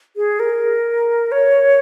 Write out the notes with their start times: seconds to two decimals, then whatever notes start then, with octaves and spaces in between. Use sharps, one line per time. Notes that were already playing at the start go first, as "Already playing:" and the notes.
0.16 G#4
0.40 A#4
1.32 C#5